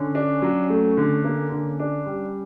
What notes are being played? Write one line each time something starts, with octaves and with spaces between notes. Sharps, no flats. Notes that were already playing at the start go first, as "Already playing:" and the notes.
Already playing: D3 C#4
D4
F#3
A3
D3
A#3 C#4
D3
D4
G3